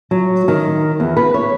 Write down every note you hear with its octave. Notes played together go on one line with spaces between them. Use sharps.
F#3
D#3
E2
B4
C#5